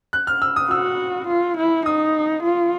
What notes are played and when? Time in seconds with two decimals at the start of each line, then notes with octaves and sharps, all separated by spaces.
0.13 F#6
0.27 F6
0.42 E6
0.56 D#6
0.70 F#4 E6
1.28 F4
1.57 E4
1.86 D#4 D#6
2.43 F4